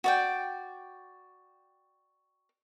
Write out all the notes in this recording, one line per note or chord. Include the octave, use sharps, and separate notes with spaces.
F#4 D5 G5